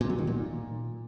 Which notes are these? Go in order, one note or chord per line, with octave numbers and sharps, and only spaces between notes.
A#2
F#3
D#3
A#2